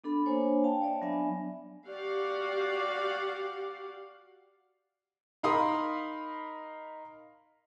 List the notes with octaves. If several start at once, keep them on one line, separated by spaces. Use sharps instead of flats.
B3 D4 A4 B5
A#3 D4 C5 C#5 G#5 A#5
F5 G5 A5
C#5 D5 E5
F#3 B3 D4 D5 E5 G#5
F#4 G4 D5 F5 F#5
D#4 A#4 F5 B5 C6 D#6